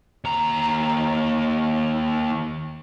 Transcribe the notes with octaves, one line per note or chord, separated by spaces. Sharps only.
D#2 A#5